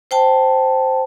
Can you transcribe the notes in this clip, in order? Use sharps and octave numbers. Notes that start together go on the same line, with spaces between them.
C5 G5 A5